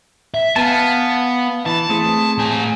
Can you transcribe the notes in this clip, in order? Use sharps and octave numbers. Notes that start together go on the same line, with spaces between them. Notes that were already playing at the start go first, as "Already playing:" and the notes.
E5
B3 F5 G#5 A5
E3 A5
A3 C4 G#4
A2 G#5